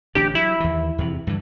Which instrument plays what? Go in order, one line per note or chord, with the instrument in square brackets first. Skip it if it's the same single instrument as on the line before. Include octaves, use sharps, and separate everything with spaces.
[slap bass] A1 D3 D4 [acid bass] G4
[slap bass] F#3 [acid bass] E4
[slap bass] D#2 E3
E2 C3
G2 D3 E3